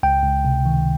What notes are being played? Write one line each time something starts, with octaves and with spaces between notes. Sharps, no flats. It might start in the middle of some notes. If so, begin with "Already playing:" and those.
C#2 G5
C#2
C3
D#3